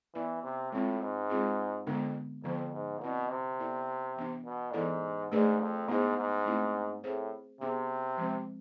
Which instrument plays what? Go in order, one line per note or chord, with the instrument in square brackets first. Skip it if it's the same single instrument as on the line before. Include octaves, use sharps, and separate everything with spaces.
[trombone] E3 [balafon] B3 E4 B4 D5
[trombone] C3
[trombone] A2 [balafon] G#3 C4 F4
[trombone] G#2
[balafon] G#3 C4 F4 G#4
[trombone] F2 [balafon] D3 G#3 B3 D4
[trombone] F2 [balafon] D3 F3 B3
[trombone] G#2
[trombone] B2 [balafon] C4 E4 B4 D5
[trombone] C3
[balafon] B3 E4 A4 D5
E3 B3 D4
[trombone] B2
[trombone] G#2 [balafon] E3 B3 E4 A4 D5
[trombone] G#2 [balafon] A3 D4 G#4 B4 D5
[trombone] F2
[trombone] G#2 [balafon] B3 E4 G#4 C5
[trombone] G#2
[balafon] A3 C4 E4
[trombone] A2 [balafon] C4 G#4 C5
[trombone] C3 [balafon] B3 D4 G#4 C5
[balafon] F3 G#3 C4